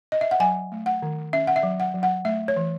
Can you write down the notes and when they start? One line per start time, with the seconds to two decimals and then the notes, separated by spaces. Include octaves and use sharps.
0.12 D#5
0.21 E5
0.31 F#5
0.40 F#3 G#5
0.72 A3
0.86 F#5
1.02 D#3
1.33 C#4 E5
1.47 F#5
1.56 E5
1.63 F#3
1.80 F#5
1.94 F#3
2.03 F#5
2.25 A3 E5
2.48 C#5
2.56 E3